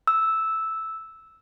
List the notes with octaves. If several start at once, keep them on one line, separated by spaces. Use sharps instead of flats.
E6